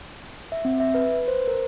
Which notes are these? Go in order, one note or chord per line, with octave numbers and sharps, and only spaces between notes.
E5
C4
E5
B4
B4
C5
A#4